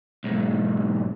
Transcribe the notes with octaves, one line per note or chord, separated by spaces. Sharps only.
B1 G#2